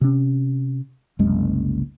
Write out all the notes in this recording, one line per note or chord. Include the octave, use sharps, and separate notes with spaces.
C3 C#4
F#1 C2 F#2 G#3